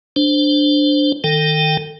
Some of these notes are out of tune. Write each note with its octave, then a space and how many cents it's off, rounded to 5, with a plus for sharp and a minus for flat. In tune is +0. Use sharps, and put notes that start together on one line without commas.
D4 +0 C5 +0
D#3 +0 A4 +25 G5 +0